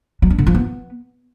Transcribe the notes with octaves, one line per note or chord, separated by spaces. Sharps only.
F#3
D4
D3
F3
B3